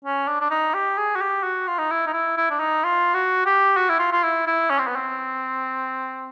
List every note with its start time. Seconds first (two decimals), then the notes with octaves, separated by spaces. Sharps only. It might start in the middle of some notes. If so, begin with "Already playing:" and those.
0.04 C#4
0.28 D4
0.41 D4
0.51 D#4
0.74 G4
0.98 G#4
1.15 F#4
1.21 G4
1.43 F#4
1.67 F4
1.79 D#4
1.91 E4
2.07 D#4
2.13 E4
2.37 E4
2.50 D4
2.60 D#4
2.84 F4
3.14 F#4
3.46 G4
3.77 F#4
3.89 E4
3.99 F4
4.12 F4
4.23 E4
4.47 E4
4.70 C#4
4.78 C4
4.87 B3
4.96 C4